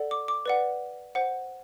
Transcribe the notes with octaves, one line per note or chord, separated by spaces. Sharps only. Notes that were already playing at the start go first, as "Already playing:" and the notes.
Already playing: A4 D5 F#5
D6
D6
B4 D5 F#5
C5 F#5